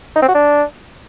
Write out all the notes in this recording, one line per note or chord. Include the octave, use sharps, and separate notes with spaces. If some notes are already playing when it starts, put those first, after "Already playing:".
D#4
C4
F#4
D4